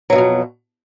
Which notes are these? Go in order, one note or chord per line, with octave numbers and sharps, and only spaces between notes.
F2 B2 E3 F#3